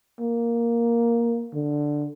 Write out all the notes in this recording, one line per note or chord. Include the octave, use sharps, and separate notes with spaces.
A#3
D3